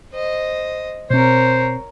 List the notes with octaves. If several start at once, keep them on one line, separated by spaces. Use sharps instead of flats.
C5 D#5
B2 C4 A#4 C5 C#5